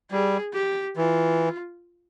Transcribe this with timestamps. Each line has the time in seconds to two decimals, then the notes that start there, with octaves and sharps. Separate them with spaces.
0.11 G3 G#4
0.54 G4
0.97 E3 F4